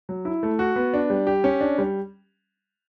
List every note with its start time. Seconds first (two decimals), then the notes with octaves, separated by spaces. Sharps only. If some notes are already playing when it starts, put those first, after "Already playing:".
0.09 F#3
0.25 E4
0.43 A3
0.59 F#4
0.76 B3
0.94 D4
1.10 G3
1.27 G4
1.44 C#4
1.61 D4
1.78 G3